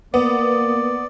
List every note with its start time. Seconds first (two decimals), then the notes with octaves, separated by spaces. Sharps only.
0.14 A#3 B3 D5